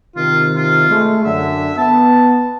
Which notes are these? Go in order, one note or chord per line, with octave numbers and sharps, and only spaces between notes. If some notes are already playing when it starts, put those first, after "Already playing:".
C3 D#3 F4
F4
G#3 A3
F#2 D3 E5
B3 A5